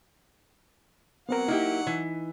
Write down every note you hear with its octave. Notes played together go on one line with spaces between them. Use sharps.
F#3 B3 C4 A#4 F#5
A#3 D#4 E4 G4
E3